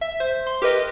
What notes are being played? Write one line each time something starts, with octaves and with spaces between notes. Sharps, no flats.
E5
C5
C6
G4 A#4 B4 D#5